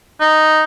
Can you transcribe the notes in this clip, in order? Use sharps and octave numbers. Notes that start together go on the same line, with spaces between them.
D#4